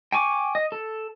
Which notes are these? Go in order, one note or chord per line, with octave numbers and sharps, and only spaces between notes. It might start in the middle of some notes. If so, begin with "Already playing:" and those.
G5 G#5 C#6 D6
D#5
A4